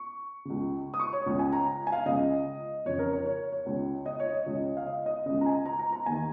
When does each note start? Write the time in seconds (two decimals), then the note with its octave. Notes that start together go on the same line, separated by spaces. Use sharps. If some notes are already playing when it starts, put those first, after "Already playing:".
Already playing: C#6
0.45 C#2 C#3
0.94 D#6
0.99 C#6
1.13 C#5
1.26 C#2 C#3
1.39 G#5
1.52 A#5
1.87 G#5
1.92 F5
2.06 C#2 C#3 D#5
2.86 F2 C#3 C#5
2.99 A#4
3.13 C#5
3.26 C#5
3.52 C#5
3.66 C#2 C#3
4.06 D#5
4.20 C#5
4.28 D#5
4.33 C#5
4.46 C#2 C#3 D#5
4.77 F5
4.86 D#5
5.06 D#5
5.26 C#2 C#3 D#5
5.41 A#5
5.46 G#5
5.66 A#5
5.79 A#5
5.92 A#5
6.06 D#2 D#3 G#5